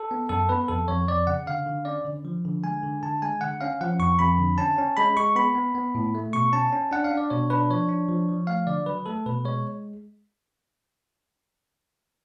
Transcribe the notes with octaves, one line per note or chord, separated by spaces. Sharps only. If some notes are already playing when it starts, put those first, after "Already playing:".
Already playing: A4
B3
F#2 A4
B3 B4
F2 A4
F2 C#5
F2 D5
C#3 F#5
D3 F5
D3
C#4 D5
D3
F3
D3
G#3 G#5
D3
D3 A5
G#3 G#5
D3 F#5
C#4 F5
F3 F#5
F2 C#6
F2 B5
D3
C#4 A5
C#4
G#3 B5
G#3 C#6
B3 B5
B3
B3
A2
A3
B2 C#6
C#4 A5
C#4
D4 F#5
F5
D4
D5
B2 C#5
D4 B4
F3 C#5
D4
F3
F3
A3 F5
D3 D5
F#3 B4
A3 A4
B2 B4
G#3 C#5